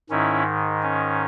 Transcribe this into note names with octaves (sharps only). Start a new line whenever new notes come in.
G#2 D#3 C#4 E4
C#4